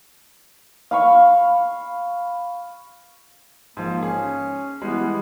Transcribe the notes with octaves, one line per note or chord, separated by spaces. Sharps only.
F5 B5 C#6
G#2 F3 A#3
C#4 G#4
E3 G3 G#3 B3